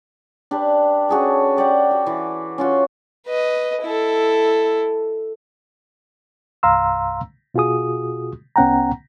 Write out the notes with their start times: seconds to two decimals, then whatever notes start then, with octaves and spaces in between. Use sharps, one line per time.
0.51 D4 G4 B4
1.09 C#4 F#4 G#4 A4
1.57 G4 D5 F#5 G5
1.91 F#4
2.06 E3
2.58 C#4 F4 F#4
3.26 B4 D#5
3.82 E4 A4
6.63 C2 G2 F5 A#5 C6 E6
7.54 B2 F4 F#4 G#4 D#6
8.56 C2 B3 C#4 F#5 G5 A#5